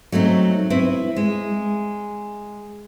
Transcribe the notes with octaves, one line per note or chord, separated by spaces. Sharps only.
F#3 A3 C4 D#4
C4 E4 B4
G#3